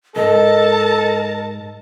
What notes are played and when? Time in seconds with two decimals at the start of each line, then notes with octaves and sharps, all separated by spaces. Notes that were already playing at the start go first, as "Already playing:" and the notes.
0.16 C2 G#2 A4 A#4 D#5 A5